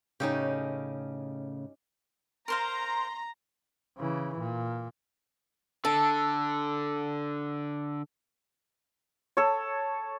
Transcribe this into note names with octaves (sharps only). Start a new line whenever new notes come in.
A2 C#3 C#4 D#4 G4
A#4 C5 F5 A#5 C6
C#3 E3
A#2
D3 A4
A4 C#5